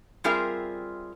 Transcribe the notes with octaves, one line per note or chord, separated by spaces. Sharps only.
G3 C4 F4 G#4 A#4 E5